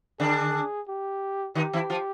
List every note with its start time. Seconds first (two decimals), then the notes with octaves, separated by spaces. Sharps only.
0.20 D3 D4 G#4
0.88 G4
1.55 D#3 D#4 G4
1.73 E3 E4
1.90 F3 F4